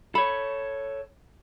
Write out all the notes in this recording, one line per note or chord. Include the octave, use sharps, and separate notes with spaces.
A4 C#5 B5